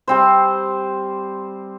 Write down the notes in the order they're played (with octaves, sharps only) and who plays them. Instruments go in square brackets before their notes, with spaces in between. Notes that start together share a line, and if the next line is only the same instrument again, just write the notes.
[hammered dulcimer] G3 C4 C5